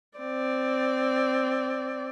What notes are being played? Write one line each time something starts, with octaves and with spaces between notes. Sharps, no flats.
C4 D5